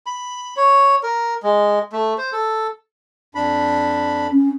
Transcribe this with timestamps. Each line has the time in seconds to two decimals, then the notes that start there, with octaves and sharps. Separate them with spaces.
0.06 B5
0.57 C#5
1.03 A#4
1.43 G#3
1.93 A3
2.18 C5
2.32 A4
3.35 F2 D4 B5
4.32 C#4